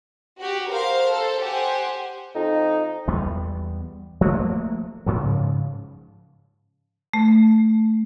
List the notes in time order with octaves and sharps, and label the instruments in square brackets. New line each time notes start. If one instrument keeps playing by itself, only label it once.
[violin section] F#4 G4
A#4 C5 F5
A4 C5
G4 C5 F#5 G#5
[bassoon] F2 [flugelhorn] D#4
[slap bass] E2 G3 B3
F3 A3 A#3
G#2 C#3 F3
[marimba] A3